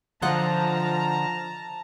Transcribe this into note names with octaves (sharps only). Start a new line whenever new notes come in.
D3 F3 F4 D#5 F#5 A5 A#5